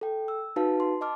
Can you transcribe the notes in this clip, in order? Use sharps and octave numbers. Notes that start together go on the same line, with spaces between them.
A4 G5
E6
D#4 F#4 B4 F5 A5
C6
D#5 A5 D6 F6